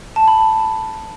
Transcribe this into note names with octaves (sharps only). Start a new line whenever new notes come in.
A5
B5